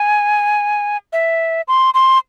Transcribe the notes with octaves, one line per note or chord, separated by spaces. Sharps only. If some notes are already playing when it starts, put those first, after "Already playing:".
Already playing: G#5
E5
C6
C6